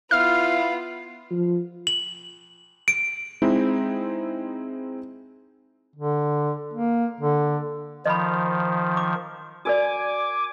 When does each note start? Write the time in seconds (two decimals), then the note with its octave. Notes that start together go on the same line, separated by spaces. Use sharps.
0.11 B3 E4 F4 F5 F6
1.31 F3
1.87 F#7
2.88 D7
3.42 G#3 C4 D#4 E4
5.96 D3
6.74 A#3
7.21 D3
8.05 D#3 F3 D#5 B5
8.97 D6
9.65 F#4 A#4 D5 G#5 D6